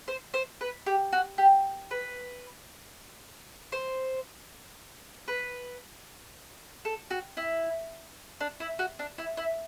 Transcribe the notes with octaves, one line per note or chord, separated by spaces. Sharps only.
C5
C5
B4
G4
F#4
G4
B4
C5
B4
A4
F#4
E4
D4
E4
F#4
D4
E4
E4